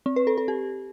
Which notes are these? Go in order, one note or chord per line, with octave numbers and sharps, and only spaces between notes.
C4
B4
A4
A4
G4